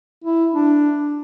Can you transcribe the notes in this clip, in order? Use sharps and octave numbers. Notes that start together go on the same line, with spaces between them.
E4
D4